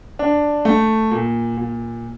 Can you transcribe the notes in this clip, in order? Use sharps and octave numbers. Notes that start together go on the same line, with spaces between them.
D4
A3
A#2
A#2